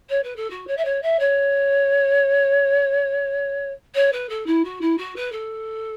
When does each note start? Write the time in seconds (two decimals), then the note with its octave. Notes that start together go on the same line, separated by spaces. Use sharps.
0.09 C#5
0.23 B4
0.36 A4
0.50 F#4
0.67 C#5
0.77 E5
0.85 C#5
1.02 E5
1.19 C#5
3.94 C#5
4.12 B4
4.29 A4
4.46 E4
4.64 F#4
4.81 E4
4.97 F#4
5.16 B4
5.32 A4